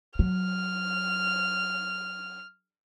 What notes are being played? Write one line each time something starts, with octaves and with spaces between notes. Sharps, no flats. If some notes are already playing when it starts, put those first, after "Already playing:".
F#3 F6